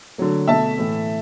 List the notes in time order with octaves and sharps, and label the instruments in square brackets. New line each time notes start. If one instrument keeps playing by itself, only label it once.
[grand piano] D3 F#3 A3
B2 A3 E5 A5
A2 E3 A3